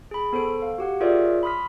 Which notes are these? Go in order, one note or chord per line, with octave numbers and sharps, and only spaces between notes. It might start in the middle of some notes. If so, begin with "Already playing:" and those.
G#4 B5
B3 A4 C5 D7
F5
F#4 G4 F#5
F4 G#4 A#4 C#5 D5 E5
B5 C6 D#6 F6 B6